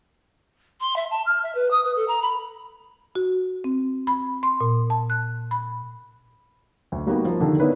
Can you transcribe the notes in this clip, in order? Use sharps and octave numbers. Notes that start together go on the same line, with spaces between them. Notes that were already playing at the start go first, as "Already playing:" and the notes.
C6
E5
A5
F6
E5
B4
D#6
B4
A4
A#5
B5
F#4
C4
B5
C6
A#2
A5
F#6
B5
D2
G3 A#3 B3 D#4 F#4 G4
F3 A#3
D3 D#3 G4 A4
B3 D4 E4 A#4 B4 C#5